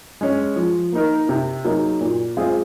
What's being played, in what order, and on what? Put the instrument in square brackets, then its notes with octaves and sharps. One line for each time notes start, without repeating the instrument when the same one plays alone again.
[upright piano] G#3 C#4
F3
A#3 D#4 A#4
C3
F#3 A#3 D#4 G#4
A#2
G#3 C4 F4 G#4